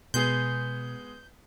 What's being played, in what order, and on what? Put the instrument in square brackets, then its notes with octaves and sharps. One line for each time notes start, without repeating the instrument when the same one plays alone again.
[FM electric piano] B2 [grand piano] G#3 B3 G#4 [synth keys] G6